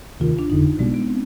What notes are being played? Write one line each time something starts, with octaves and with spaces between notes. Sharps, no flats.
D2 C3 D#3 F4
D4
G1 F2 D3 D#4
B1 B2 G3 G#3 B3
B3
C4